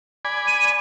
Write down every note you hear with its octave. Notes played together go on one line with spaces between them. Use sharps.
D5 G#5 B5
D#7